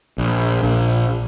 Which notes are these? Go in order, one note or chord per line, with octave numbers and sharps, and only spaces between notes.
A#1
A#1